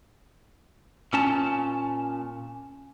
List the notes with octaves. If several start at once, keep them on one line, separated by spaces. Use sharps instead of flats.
A#2 C#4 A5